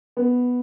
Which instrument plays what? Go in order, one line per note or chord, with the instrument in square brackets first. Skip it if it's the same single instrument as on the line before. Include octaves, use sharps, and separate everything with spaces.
[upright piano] B3